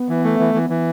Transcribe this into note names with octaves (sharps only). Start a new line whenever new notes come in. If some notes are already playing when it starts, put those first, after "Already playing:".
Already playing: B3
E3
A3
E3
E3
E3